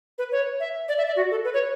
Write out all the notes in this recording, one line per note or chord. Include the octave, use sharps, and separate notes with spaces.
B4
C#5
E5
D5
E5
D5
F#4
A4
B4
C#5